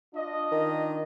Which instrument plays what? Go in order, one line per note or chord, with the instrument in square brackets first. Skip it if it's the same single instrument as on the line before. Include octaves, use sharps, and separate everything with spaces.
[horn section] D4 F4 D#5
[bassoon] D#3